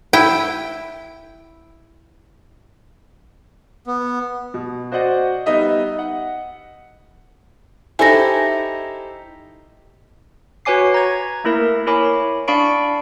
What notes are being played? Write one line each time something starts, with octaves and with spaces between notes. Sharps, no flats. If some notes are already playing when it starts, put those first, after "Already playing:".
E4 G5
B3
B2
F#4 C5 D5 D#5 F#5
G3 B3 D#4 D#5 E5
F#5
D#4 E4 G4 A4 C5 G#5 A#6
F#4 B4 C#5 G#5 D6 C7
A#5 G#6
A3 A#3 E4 A#4 E5
E4 A#4 C#5 G#5 B5 D6
D4 D5 F5 B5 C#6 D7